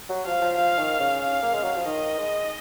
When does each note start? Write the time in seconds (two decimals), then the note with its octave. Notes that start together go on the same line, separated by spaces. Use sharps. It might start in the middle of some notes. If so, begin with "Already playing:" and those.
0.09 F#3
0.25 F3 F5
0.41 F3
0.57 F3 F5
0.79 D#3
1.00 C#3
1.21 F5
1.42 A#3
1.53 G#3
1.63 F#3
1.75 F3
1.85 D#3 D#5
2.18 G#3